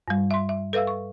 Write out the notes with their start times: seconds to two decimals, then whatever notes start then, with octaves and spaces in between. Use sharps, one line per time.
0.08 G2 G3
0.31 E5 C6
0.49 E5
0.73 A4 B4 E5 F5 E6
0.87 C#6